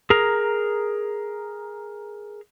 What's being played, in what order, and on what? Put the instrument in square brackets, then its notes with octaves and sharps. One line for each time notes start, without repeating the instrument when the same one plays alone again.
[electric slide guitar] G#4 A#4 A#5